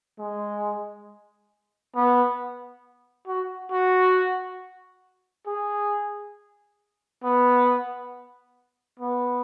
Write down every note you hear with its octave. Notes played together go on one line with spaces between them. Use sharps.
G#3
B3
F#4
F#4
G#4
B3
B3